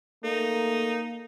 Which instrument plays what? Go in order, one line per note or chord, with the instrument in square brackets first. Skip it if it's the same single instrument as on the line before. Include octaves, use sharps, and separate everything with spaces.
[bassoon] A3 [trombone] A#3 [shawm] D#4